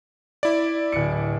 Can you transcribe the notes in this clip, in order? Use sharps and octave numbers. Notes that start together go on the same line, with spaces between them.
E4 D5
D1 C#7